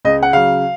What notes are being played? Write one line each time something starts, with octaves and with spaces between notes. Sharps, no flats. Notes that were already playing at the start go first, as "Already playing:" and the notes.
C#2 D#5
F#5
C#3 F#3 F5